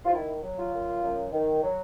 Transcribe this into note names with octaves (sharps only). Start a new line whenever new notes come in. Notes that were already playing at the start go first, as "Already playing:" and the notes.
F4
D#3 E4
F#3
F4
F#2
F#2
D#3
F#3